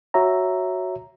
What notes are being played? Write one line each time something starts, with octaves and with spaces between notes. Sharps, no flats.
F#4 C#5 E5 A#5